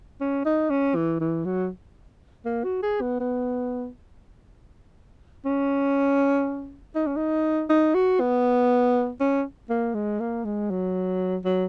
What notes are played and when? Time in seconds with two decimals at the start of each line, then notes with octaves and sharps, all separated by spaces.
0.21 C#4
0.45 D#4
0.70 C#4
0.95 E3
1.20 E3
1.45 F#3
2.45 A#3
2.64 F#4
2.83 G#4
3.01 B3
3.20 B3
5.45 C#4
6.95 D#4
7.07 C#4
7.17 D#4
7.69 D#4
7.95 F#4
8.20 B3
9.20 C#4
9.70 A#3
9.94 G#3
10.20 A#3
10.45 G#3
10.70 F#3
11.45 F#3